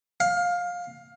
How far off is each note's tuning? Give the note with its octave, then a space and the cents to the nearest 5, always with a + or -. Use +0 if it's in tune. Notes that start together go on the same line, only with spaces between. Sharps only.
F5 +20